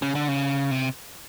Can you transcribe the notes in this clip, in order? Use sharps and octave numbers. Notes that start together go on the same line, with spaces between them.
C#3
D3
C#3
C3